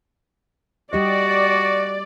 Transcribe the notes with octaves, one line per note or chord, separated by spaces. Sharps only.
G3 F#4 G4 D5 D#5